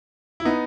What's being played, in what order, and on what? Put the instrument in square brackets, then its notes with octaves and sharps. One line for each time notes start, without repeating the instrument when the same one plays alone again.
[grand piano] E4
B3 D#4